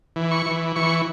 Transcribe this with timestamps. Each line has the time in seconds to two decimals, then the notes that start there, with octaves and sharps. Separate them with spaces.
0.16 E3
0.31 C#6
0.46 E3
0.76 E3 C#6